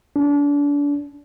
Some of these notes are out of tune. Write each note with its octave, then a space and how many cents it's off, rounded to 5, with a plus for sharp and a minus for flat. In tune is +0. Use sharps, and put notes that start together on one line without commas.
D4 -35